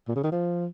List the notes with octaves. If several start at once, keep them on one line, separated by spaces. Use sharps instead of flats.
A#2
C#3
D#3
F3